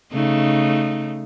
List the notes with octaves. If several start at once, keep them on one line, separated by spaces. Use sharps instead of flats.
C#3 A3 D#4